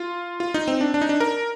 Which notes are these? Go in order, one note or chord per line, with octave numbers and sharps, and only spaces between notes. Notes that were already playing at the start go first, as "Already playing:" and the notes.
Already playing: F4
F4
D#4
C4
D4
D4
D#4
D4
A#4